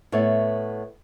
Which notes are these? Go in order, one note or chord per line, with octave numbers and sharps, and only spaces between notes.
A2 B3 C#5 E5